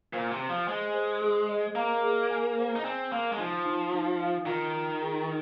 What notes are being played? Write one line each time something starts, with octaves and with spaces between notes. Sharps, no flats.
A#2 C5
C3
C5
F3
G#3 C5
C5
G#4
D#5
A#3 A#5
G#4
G#5
C5
D#4
C4 G#5
A#3 C6
G#3
F3 D#4
D#4
D#4
F5
D#3 F4
F4
G#4